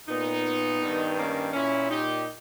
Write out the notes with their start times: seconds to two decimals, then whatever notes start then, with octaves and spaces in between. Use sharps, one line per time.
0.09 A#2 B3 D#4
0.81 G2 D#3
1.17 A#3 C#4
1.53 A#2 C#4 E4
1.90 D#4 G4